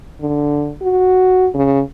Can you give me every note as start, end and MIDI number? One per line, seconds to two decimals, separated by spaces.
0.21 0.72 50
0.82 1.48 66
1.54 1.80 49